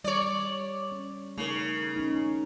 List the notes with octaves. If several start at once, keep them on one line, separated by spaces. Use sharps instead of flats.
G3 C#5 D5
C#4
C#3 A3 D#4 A#4
C#4 D#4